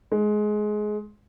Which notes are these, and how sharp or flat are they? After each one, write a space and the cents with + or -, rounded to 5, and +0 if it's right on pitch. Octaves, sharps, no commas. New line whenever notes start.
G#3 +20